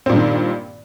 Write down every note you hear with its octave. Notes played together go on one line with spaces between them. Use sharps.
G2 A#2 D#3 C4